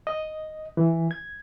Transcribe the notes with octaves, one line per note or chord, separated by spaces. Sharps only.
D#5
E3
G#6